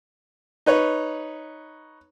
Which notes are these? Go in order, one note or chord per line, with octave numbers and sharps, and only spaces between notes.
D#4 B4 C#5